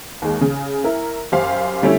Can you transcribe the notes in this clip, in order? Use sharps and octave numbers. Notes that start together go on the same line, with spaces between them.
D#2 G#3
C#3
E4 A#4
F#2 G4 C5 F5
D3 G3 A3 C#4 E4